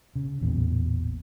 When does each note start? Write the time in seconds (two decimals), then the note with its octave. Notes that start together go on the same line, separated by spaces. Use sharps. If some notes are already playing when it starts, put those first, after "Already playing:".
0.15 C#3
0.41 A1 E2 A#2